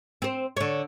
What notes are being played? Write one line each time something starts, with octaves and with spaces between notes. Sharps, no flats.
C4 C5
D3 C#5